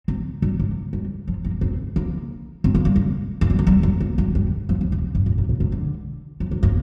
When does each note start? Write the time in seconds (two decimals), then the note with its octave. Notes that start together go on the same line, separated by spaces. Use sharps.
0.08 C4
0.42 G3
0.60 A#3
0.93 G3
1.28 F3
1.45 A#3
1.61 C4
1.96 A#3
2.64 C4
2.75 A#3
2.85 G3
2.96 A#3
3.41 A#3
3.50 G3
3.59 A#3
3.67 G3
3.83 A#3
4.00 A#3
4.18 G3
4.35 G3
4.69 F3
4.81 D3
4.92 C3
5.15 G2
5.26 A#2
5.38 A#2
5.49 A#2
5.60 C3
5.72 D3
6.40 F3
6.51 G3
6.63 A#3